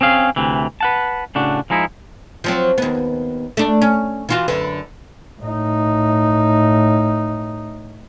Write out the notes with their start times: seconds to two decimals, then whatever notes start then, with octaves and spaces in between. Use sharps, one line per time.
0.01 C4 C#4 G#4 F5
0.36 D2 C3 E3
0.81 B4 F#5 A5
1.35 A2 C#3 D4 F#4
1.70 F3 G#3 D#4 E4
2.44 F3 F#3 C4
2.78 D#2 B3
3.57 A3 D4
3.82 C#4
4.29 E3 F4 F#4
4.48 F#2 D3 B4
5.41 A2 D#4